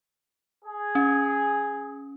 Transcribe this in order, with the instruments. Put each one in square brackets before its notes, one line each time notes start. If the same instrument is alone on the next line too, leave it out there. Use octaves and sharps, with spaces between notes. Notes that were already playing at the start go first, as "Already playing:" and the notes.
[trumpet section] G#4
[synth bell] C#4